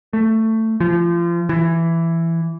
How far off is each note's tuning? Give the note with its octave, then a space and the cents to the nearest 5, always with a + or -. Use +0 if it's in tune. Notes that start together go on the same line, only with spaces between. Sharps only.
A3 +15
F3 -30
E3 +10